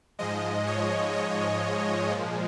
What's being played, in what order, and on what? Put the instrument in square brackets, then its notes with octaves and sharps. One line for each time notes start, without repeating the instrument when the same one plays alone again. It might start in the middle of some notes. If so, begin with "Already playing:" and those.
[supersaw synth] G#2 F3 G#3 D#5
C#5
C#5
A#2 F3 G#3